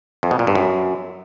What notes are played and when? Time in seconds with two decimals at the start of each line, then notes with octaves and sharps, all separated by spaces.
0.23 F2
0.31 B2
0.39 A#2
0.47 G2
0.55 F#2